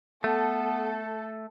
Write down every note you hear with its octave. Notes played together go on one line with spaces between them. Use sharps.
A3 B3 A4